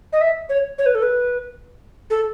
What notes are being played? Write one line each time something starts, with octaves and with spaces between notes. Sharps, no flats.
D#5
E5
C#5
C#5
B4
A4
B4
A4